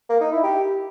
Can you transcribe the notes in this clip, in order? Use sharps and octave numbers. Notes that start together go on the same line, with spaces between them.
A#3
D#4
E4
G4